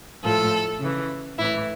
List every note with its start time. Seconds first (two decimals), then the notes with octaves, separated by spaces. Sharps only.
0.24 A2 F3 A4
0.81 C#3 E3
1.38 A2 E3 E4